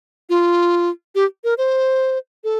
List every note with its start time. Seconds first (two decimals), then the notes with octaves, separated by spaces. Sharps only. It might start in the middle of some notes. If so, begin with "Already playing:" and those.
0.29 F4
1.15 G4
1.44 A#4
1.58 C5
2.44 A4